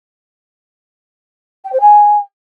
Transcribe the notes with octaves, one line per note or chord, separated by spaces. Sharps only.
G5
C5
G#5